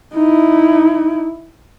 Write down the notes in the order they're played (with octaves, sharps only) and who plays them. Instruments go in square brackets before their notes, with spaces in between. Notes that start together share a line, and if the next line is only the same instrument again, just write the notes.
[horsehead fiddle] D#4 E4